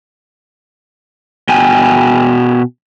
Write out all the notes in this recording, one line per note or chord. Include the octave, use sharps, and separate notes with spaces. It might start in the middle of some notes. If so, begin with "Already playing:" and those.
B2 G5 G#5